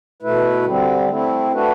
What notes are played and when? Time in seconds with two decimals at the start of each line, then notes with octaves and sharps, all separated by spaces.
0.22 B2 A3 E4 B4
0.66 D3 G3 C4
1.09 A3 C4 E4
1.52 A3 D4 F#4 B4